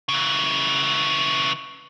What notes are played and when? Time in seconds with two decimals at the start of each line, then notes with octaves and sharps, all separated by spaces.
0.09 C#3 E3